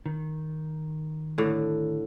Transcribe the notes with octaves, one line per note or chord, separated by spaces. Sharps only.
D#3
A2 D3